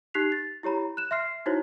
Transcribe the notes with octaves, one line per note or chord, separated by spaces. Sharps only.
D#4 G4 F#6 B6 C7 F7
A6
E4 G4 C#5 A#5 B5
F#6 E7
E5 C6 F6 C7
D#4 E4 F#4 C5 C#5